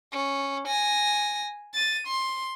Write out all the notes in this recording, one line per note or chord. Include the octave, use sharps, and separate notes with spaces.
C#4
G#5 A#6
A6 D#7
C6